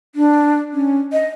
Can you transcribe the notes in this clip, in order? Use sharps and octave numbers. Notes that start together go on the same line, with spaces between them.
D4
C#4
D#5